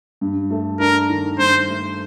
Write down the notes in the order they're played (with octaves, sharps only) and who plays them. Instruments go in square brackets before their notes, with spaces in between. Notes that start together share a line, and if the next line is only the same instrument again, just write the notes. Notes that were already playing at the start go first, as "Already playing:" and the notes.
[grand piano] G2
A3
[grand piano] D4 [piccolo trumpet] A#4
[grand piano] D#3
[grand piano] G2 [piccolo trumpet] C5
[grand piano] A3